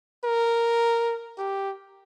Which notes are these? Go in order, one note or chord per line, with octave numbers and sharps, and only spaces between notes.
A#4
G4